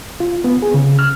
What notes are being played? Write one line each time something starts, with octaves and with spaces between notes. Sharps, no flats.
F4
B3
G#4
C#3
F6